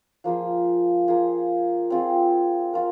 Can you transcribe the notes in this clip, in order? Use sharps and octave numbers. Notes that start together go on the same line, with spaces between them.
F3 A#3 F4 G#4
A#3 F4 G#4
C4 F4 G#4
F4 A#4